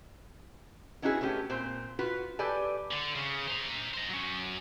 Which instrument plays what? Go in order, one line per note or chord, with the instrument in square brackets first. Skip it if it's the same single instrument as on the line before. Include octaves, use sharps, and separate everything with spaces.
[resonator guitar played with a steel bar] B3 C#4 D#4 E4 F#4 G#4
A3 B3 C#4 G4
A#2 C4 C5
F4 F#4 B4
G4 A4 B4 D5 G#5
[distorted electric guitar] D3
C#3
C5 A#5
C5 D#5
F#3 C#4